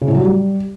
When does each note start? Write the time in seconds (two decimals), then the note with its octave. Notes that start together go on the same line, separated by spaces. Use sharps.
0.01 C#3
0.08 A2
0.15 F#3
0.21 G3